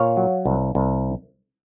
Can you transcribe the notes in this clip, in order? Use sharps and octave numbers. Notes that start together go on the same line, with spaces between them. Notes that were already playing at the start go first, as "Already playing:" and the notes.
Already playing: A#2 C#5 F5
F#3
C2
C2